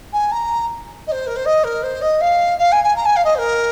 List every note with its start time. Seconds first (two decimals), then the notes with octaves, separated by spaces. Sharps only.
0.13 G#5
0.32 A#5
1.07 D#5
1.12 C5
1.26 A#4
1.36 C5
1.45 D#5
1.64 A#4
1.83 C5
2.01 D#5
2.21 F5
2.58 F5
2.72 G#5
2.84 G#5
2.96 A#5
3.05 G#5
3.16 F5
3.24 D#5
3.35 C5
3.38 A#4